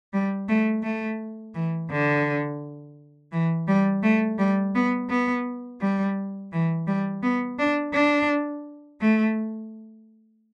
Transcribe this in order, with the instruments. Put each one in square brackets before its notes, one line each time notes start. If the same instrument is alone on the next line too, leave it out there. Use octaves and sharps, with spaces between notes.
[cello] G3
A3
A3
E3
D3
E3
G3
A3
G3
B3
B3
G3
E3
G3
B3
D4
D4
A3